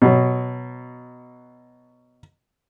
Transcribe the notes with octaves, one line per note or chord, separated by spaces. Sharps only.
B2 F#3